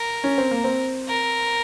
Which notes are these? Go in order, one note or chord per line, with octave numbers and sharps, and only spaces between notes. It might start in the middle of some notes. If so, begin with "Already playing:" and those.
Already playing: A#4
C#4
C4
A#3
C4
A#4